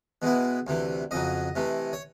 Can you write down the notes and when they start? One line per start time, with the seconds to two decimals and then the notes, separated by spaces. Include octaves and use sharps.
0.22 B2 G#3 B3 E4
0.67 D2 C3 E3
1.11 F2 C#3 F#3 D#5
1.55 C3 E3 A3
1.93 C#5